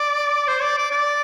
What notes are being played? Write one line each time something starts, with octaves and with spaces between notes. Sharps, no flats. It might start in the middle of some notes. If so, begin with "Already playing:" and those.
Already playing: D5
C5
D5
D5
D5